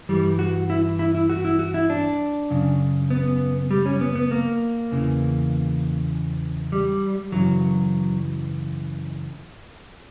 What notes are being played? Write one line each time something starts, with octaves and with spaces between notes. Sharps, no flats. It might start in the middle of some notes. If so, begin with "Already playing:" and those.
G2 E3 G3
F#4
E4
E4
E4
F#4
E4
F#4
E4
D4
F#2 C#3
B3
G3
C#4
B3
B3
A#3
E2 C#3 E3
G3
F#2 C#3 E3 F#3